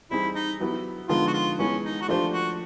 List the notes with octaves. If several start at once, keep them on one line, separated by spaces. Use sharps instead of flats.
E3 G3 C4 D#4 E4 G#4
D#4
F#3 B3 E4 G4
D3 F3 G#3 B3 D#4 F4
F#4
F4
E3 G#3 B3 C#4
D#4
F#4
F3 A3 D4 F4 G4 C5
F#4